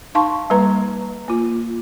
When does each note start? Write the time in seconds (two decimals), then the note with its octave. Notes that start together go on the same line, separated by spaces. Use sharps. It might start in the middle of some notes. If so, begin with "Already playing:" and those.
0.15 D#4 F5 A5 C6 C#6
0.50 G3 A#3 B4 A#5
1.28 A#3 F4